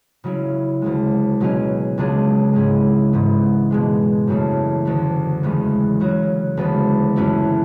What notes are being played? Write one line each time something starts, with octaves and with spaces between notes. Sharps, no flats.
C#3 F#3 C#4 E4
D2 C#3 G#3
B2 F#3 C#4 G#4
C#2 C#3 G#3 D4 G#4
G#2 G#3 C#4 E4 G#4
G#2 E3 B3
B2 G#3 D4
F#2 C#3 E3 A3
D2 D3 A3
E2 C#3 E3 G#3 C#4
C#3 F#3 C#4 F#4
D2 C#3 E3 G#3 B3
F#2 E3 A3 C#4 E4